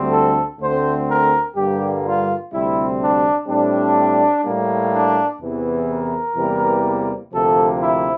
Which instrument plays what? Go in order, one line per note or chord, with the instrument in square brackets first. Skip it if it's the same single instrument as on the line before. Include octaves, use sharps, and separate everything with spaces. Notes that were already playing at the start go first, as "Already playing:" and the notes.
Already playing: [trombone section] D2 D3 G3 C4
A4
D2 D3 A3 C4 C5
A#4
G2 D3 G3 A#3 G4
F4
D2 C3 G3 C4 E4
D4
A2 G3 C4 D4
A2 G3 A#3
D4
E2 C3 E3
A#4
E2 C3 E3 G3 A#3
D2 C3 F3 A#3 A4
E4